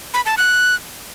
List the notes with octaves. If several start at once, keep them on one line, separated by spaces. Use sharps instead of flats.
B5
A5
F#6